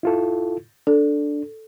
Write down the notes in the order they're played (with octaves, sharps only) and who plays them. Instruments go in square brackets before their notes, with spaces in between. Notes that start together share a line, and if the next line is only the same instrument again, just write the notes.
[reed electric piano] E4 F4 A4
[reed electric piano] D4 [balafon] A4